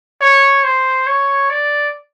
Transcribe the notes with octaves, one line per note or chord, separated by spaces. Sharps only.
C#5
C5
C#5
D5